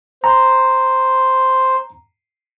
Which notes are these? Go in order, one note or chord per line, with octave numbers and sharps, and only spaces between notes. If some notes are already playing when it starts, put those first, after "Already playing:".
C5 A#5